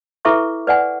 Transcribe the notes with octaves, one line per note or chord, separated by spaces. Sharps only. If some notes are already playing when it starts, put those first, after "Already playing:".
E4 A4 B4 E5 C#6 D6
B4 D5 F#5 G#5